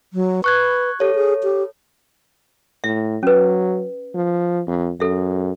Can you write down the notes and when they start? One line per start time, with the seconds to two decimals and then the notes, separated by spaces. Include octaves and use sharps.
0.13 F#3
0.44 B4 C#6 F#6 G#6
1.00 G4 A4 C#5
1.15 G#4
1.43 G4
2.84 A2 E5
3.23 F#3 C#4 B4
4.15 F3
4.68 F2
5.00 F#2 A4 E5